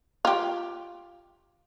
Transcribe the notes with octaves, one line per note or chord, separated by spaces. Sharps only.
F4 G4